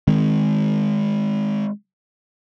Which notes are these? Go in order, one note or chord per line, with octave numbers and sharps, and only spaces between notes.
D#3 G#3 C4